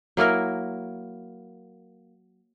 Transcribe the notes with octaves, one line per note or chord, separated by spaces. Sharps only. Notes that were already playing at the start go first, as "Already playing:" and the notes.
F#3 A#3 E4 A#4